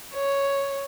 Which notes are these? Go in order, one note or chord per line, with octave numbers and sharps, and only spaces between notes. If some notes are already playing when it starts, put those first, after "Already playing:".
C#5